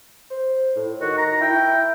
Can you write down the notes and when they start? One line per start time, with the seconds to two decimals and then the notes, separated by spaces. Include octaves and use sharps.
0.30 C5
0.76 A2
1.01 D#3 F#4
1.17 A#5
1.41 E4 G5